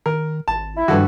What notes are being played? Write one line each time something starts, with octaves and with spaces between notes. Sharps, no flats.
D#3 A#4
G#1 A5
E4
G2 D#3 F3 G3 F#4 A4 B4